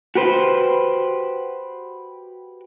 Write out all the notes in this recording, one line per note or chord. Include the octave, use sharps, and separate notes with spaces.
F#4 G4 B4 C5